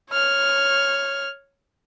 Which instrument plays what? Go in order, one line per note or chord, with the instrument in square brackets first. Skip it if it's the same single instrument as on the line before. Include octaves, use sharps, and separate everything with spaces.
[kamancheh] C#5 F6